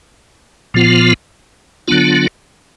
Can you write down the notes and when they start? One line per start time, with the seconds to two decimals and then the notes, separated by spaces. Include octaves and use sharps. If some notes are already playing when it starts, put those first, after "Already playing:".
0.74 A#2 F3 B3 F4
1.88 D3 F#3 B3 D4 F4